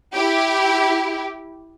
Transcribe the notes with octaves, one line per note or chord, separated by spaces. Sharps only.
E4 G4